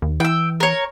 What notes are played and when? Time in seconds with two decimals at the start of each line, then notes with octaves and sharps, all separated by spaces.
0.02 D#2
0.20 E3 G5 E6
0.60 A#4 C#5